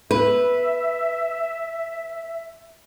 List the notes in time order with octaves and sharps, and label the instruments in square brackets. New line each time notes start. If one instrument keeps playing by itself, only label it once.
[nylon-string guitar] B4 [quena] E5